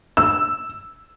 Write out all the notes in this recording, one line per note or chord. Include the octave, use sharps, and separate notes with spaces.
E6